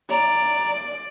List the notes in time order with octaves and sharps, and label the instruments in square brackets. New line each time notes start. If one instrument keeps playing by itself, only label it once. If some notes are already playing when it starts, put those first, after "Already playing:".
[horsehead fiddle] D5 [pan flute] A#5